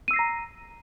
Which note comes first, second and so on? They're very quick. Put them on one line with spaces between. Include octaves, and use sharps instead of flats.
D#7 E6 C7 A#6 A#5